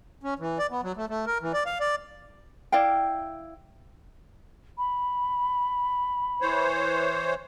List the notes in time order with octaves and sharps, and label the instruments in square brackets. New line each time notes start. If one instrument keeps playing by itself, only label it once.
[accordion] C#4
E3
D5
B3
F#3
A3
A3
A#4
E3
D5
F5
D5
[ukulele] E4 D5 F5 G5
[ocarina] B5
[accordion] E3 C5 C#5